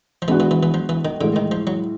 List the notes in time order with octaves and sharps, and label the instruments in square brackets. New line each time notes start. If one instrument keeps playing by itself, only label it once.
[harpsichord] F3
[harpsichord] E3 [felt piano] G#3 B3 D4 F#4
[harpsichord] E3
E3
E3
F3
E3
D#3
[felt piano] A2 E3 G#3 [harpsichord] D3
[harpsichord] D#3
F3
F#3